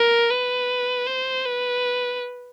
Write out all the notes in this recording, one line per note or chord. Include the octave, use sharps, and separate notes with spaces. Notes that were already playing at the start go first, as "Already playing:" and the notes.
Already playing: A#4
B4
C5
B4